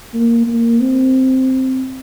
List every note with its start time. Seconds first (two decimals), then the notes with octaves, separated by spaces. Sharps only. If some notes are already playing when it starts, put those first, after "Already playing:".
0.14 A#3
0.47 A#3
0.80 C4